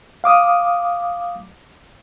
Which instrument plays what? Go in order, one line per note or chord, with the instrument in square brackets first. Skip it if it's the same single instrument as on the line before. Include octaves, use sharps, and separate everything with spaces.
[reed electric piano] F5 D6 D#6